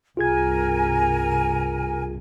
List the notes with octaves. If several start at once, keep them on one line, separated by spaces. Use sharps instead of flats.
C2 G2 F4 G#4 A#4 G#5 G#6